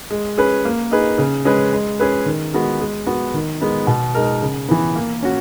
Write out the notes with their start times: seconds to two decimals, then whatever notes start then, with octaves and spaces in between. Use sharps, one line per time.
0.10 G#3
0.38 C#4 G#4 B4
0.65 A#3
0.91 D#4 G#4 B4
1.18 C#3
1.45 G#3 C#4 G#4 B4
1.73 G#3
2.00 C#4 G#4 B4
2.26 D#3
2.54 G#3 B3 F#4
2.81 G#3
3.07 B3 F#4
3.34 D#3
3.61 G#3 B3 D#4
3.87 B2
4.15 G#3 D#4 A#4
4.42 C#3
4.69 E3 B3
4.96 A#3
5.23 C#4 F#4